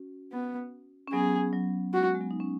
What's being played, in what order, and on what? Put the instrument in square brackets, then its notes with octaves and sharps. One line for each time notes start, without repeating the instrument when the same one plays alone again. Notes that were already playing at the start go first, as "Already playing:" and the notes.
Already playing: [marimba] C#4 F#4
[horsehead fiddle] B3
[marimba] C#4
[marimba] F#3 B3 [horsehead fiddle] G#4
[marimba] F#3
[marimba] G#3 [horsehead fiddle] F#4
[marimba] G#3
F#3 B3
D#4
C#4